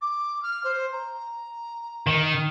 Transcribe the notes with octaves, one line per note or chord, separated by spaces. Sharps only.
D6
F6
C5
A#5
D#3